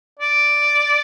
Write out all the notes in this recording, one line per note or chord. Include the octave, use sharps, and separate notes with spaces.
D5